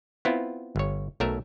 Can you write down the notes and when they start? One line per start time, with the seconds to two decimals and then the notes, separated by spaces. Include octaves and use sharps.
0.25 B3 C4 E4 F4
0.76 G1 C#5
1.20 B1 F#3 A3 A#4 E5